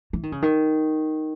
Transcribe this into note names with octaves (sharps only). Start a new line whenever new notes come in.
E3
D#3
C#3
D#3